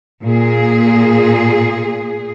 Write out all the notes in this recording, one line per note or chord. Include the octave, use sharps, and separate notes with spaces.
A#2 G#4